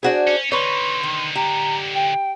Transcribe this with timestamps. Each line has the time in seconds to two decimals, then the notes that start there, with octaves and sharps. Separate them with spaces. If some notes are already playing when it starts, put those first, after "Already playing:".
0.03 D4 F#4 G#4 C5
0.28 C#4
0.52 D3 D#4 B4 C#5 C6
1.03 D#3
1.35 G4 A#5
1.94 G5